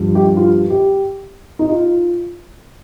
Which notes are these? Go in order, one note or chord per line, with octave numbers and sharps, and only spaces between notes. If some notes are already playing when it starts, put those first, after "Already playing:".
Already playing: G2 F3
G4
F4
G4
D#4
F4